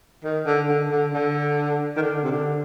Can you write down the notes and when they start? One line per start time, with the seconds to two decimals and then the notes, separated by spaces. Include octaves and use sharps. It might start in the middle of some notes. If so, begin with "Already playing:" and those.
0.24 D#3
0.46 D3
0.69 D3
0.91 D3
1.14 D3
1.97 D#3
2.02 D3
2.23 C3
2.32 D3